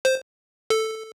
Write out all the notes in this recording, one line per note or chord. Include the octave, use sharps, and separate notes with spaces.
C5
A4